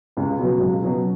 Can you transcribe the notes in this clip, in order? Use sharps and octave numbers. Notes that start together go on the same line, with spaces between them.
C#2
B2 F#3
C#2
B2 F#3